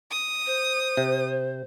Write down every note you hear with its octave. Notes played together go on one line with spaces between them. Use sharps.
D#6
C5
C3